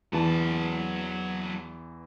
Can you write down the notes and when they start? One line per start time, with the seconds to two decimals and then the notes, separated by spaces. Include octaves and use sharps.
0.13 E2 E3 F#3 A5